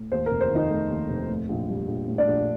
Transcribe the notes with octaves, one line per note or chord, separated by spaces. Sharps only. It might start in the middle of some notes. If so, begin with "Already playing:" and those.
Already playing: A2
D#2 C5
F1 A#4
C5
D#3 D#4 D#5
A3
D#2
F1
A2
A#1
G3
A#1
A2
D4 D5
A#1